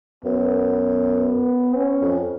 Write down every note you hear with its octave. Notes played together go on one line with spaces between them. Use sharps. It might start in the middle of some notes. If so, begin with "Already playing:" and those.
F#2 B3
C#4
F2